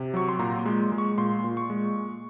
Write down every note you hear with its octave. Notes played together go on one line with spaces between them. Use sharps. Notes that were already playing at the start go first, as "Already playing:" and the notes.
Already playing: C3
F#3 C#6
C6
A#2 A#5
C6
G#3
G#3
C#6
A#2 C6
A#2
C#6
G#3